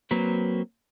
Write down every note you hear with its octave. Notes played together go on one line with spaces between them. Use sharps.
F#3 A#3 C4 B4